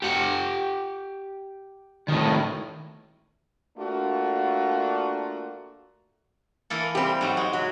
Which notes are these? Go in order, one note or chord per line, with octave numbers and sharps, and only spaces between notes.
G4 F#5
A2 D#3
A3 A#3 D4 F4 F#4
E3 A#3 A4
G3 C4 G4
G#2 F#3 C5
G#3
F#3